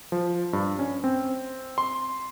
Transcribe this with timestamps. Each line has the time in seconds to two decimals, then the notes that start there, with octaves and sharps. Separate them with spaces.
0.12 F3
0.53 G2
0.79 C#4
1.04 C4
1.78 C6